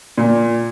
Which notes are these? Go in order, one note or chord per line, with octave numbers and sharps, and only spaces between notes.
A#2